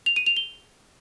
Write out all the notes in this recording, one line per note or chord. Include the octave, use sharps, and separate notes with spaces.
F7
D#7
F7
G7